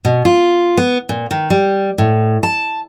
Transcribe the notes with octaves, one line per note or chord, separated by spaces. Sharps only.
B2
F4
B3
A#2
D#3
G3
A2
A5